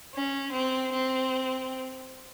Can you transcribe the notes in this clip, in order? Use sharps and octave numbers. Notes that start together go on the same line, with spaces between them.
C#4
C4
C4